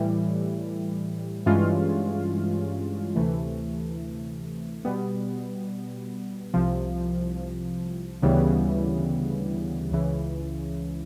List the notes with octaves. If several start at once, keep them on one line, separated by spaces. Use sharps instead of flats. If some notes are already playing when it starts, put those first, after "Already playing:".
Already playing: A2 E3 G3
G2 E3 G#3 C#4 F4
D2 C3 E3 A3
B2 G3 B3
C2 C3 F3
D2 C#3 E3 G3 B3
C#2 C#3 E3